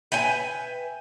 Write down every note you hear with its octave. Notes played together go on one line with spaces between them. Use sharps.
B4 E5 G5 G#5